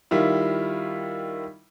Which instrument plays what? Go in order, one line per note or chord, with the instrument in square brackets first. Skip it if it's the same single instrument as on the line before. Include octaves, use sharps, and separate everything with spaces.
[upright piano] D#3 G3 E4 F4